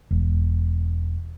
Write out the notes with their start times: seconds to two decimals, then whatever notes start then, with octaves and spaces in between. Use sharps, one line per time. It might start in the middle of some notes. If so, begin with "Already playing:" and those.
0.11 E1